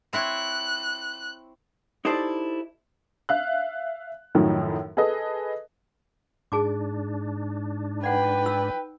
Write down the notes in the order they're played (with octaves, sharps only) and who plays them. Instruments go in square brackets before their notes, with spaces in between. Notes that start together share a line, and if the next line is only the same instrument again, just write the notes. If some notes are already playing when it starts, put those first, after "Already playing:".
[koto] C4 E4 C#5 [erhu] F#6
[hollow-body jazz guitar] D#4 E4 G4 A4 C5 D5
[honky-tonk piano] E5 F5 F#6
F#2 A2 D#3 F3 C#4 D#4
G#4 A4 B4 D#5
[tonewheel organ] G#2 D4 [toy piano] G#4 A5 D6
[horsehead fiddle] B4 G5 [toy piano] D5 F#5
[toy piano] D#4 E6